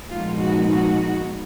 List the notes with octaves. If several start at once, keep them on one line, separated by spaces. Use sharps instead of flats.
A#2 F3 G#3 B3 D#4 F4
F#4
F#4